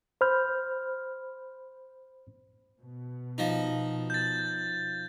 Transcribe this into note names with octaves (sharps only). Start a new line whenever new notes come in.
C5 B5 F6 G6
B2
F3 D#4
G6 A6